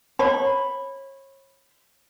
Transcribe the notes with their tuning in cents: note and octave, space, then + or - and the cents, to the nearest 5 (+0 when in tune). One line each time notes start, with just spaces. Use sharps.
C#5 -30 B5 +0